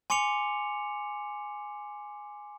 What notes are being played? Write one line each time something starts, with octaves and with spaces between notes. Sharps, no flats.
G#5 C6 D6 C#7 F7